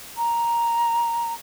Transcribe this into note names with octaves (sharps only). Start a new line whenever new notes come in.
A#5